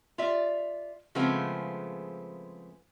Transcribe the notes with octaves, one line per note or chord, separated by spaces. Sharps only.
F4 D5 E5
C#3 F3 G#3 A3 B3 C4